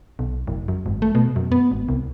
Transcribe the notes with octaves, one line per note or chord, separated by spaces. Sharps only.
B1
F#1
F#2
G#1
A3
B2
F#2
B3
G#1
C2